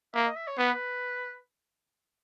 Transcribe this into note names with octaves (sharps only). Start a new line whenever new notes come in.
A#3 E5
D#5
E5
C#5
B3 B4